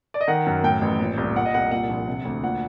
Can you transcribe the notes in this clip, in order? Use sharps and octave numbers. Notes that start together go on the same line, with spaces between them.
D5
D#5
D#3 F#5
F#2
A2 G5
A1
A#2
C2
A#2 F#5
D#5
C2 F#5
A#2 F#5
A#1
C3
D2
A#2 F#5